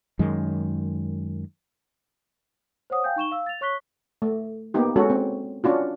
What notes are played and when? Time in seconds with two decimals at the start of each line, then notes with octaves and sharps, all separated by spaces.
0.19 F#2 D#3 G#3
2.90 C5 C#5 F#5 D#6
3.04 F5 G5 G#5 G6
3.16 D#4 C#6 E7 G7
3.31 F5 E6
3.46 A6 F7
3.61 C#5 C#6 F#6 B6 G7
4.22 A3
4.74 A#3 B3 D#4 G4
4.96 G#3 C#4 F#4 A4
5.10 C4
5.64 C#4 D4 F4 F#4